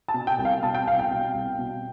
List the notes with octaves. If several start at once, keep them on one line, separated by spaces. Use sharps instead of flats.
A5
B2
G5
C2
F5
B2 A5
G5
C2 F5
G5
B2
C2
B2